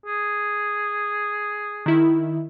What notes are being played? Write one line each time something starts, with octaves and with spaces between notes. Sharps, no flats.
G#4
D#3 E4